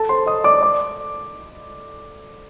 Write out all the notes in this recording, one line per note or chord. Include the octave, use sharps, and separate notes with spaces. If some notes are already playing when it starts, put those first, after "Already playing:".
Already playing: A4 A5
C5 C6
D#5 D#6
D5 D6
D5 D6